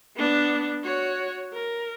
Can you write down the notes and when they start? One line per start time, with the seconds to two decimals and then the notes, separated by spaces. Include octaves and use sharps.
0.16 B3 D4
0.84 F#4 C#5
1.53 A#4